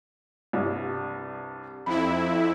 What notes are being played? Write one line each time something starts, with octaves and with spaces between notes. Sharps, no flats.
C2 G2
F2 E4 B5